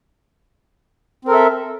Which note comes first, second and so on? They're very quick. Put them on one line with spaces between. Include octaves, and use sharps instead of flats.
C4 A#4 A4 E5